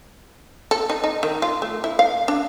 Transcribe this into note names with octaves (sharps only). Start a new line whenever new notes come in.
A4
D#4
D#4
D#3
F4
A3
E4
F5
D4